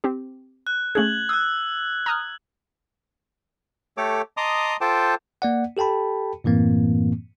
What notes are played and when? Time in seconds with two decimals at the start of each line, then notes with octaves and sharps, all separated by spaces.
0.04 C4 G4
0.67 F#6
0.95 A3 C#4 G#4 G#6 F#7
1.29 D#6 E6 F#6
2.06 A#5 D#6 F6
3.97 A3 G4 A4 C#5 D6
4.37 D#5 A5 A#5 C6 D6 D#6
4.81 F4 A4 C5 G5 A5 D6
5.42 A#3 D5 F#5
5.77 G4 A4 G5 A5 B5
6.44 F#2 A2 E3 A#3 C4